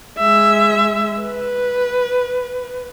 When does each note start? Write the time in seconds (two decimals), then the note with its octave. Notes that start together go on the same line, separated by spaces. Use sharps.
0.18 G#3 E5
1.22 B4